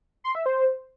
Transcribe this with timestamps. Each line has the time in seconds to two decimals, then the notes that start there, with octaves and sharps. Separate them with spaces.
0.24 C6
0.35 E5
0.46 C5